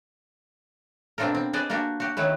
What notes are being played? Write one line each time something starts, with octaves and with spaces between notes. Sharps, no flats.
B2 C4 D4 F4 A4 A#4
C4
G#4 B4 C5 D5 D#5
A#3 D4 F#4 G4
F#4 G4
D#3 F#3 E4 B4